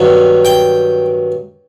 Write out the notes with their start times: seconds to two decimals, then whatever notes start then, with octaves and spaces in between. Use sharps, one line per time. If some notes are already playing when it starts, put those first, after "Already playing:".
Already playing: G2 D#3 F#3
0.45 G5